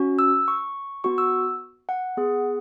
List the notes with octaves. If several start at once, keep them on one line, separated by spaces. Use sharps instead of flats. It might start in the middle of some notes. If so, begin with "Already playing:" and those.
Already playing: C#4 F#4
E6
C#6
B3 F#4 C#6
E6
F#5
B3 G#4